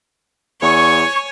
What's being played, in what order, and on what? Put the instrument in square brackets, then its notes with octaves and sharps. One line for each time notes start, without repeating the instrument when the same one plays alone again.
[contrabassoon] E2 [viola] C#5 G#5 [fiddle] C#6